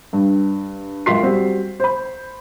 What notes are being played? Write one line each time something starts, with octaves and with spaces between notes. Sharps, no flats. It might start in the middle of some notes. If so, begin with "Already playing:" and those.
G2
C#2 F#2 F4 C6 B6 C7
G3 C4 F#4 G4
C5 B5